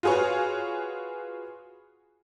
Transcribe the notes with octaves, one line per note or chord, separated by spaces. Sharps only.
F4 F#4 G#4 B4 C#5